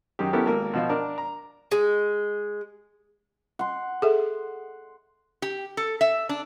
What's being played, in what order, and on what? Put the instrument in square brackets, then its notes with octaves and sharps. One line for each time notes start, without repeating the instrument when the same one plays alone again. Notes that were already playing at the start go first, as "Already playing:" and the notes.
[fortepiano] F#2 D#3 G4
B3 C#4 E4 G4 A4 A#4
G#1 A#3 A#4
B2 F3 F4
D4 A#4
A#5
[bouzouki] G#3
[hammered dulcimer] F#5 C6
[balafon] G#4 A4 E5
[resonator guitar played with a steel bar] G4
A4
E5
D4